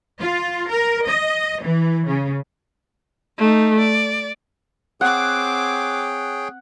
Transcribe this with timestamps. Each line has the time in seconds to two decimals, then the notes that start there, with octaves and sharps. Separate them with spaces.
0.21 F4
0.70 A#4
1.07 D#5
1.62 E3
2.07 C#3
3.38 A3 D#4
3.79 D5
5.01 C4 G#4 C#5 F#5 G5 D6